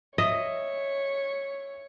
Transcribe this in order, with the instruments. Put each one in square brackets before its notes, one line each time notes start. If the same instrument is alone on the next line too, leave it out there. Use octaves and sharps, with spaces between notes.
[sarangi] C#5 [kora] D#5 [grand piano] E5